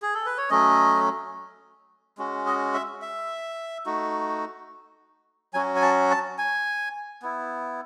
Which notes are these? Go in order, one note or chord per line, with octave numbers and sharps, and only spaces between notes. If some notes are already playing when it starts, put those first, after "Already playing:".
G#4
A4
B4
C#5
F#3 A3 C#4 D#5
G#3 C#4 F#4
D#5
E5
E5
A3 D#4 F#4
F#3 C#4 F#4 G#5
G#5
A5
A5
G#5
B3 E4